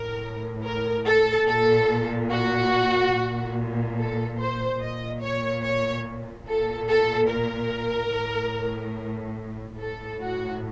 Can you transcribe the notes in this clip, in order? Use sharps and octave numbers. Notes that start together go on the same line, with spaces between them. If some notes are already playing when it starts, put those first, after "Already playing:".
Already playing: A2 A#4
A#4
A4
A#2 A4
F#4
A#2
A4
C5
A#2 D#5
C#5
C#5
A#2 A4
A4
A#4
A2
A2 A4
F#4